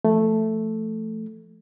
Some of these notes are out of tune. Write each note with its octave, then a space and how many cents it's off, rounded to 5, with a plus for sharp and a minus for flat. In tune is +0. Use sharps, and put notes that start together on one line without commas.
F3 -30 A3 +0